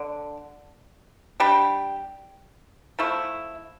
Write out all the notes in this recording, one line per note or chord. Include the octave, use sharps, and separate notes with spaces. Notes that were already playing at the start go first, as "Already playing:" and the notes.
Already playing: D3 D4
G3 D4 G4
F3 A3 E4